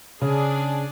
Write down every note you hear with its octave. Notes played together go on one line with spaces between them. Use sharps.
C#3 D4 G#4